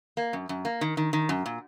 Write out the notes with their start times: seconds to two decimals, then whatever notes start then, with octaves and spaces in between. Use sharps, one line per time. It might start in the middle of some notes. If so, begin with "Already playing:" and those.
0.17 A#3
0.33 F#2
0.49 F#2
0.65 A#3
0.81 D#3
0.97 D#3
1.13 D#3
1.29 F#2
1.46 A#2